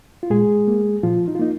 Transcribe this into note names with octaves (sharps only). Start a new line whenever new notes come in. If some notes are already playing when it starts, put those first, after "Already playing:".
F4
A#2 G#3 G#4
A#3
A#2 F3 F4
D#4
F4
A#3 D#4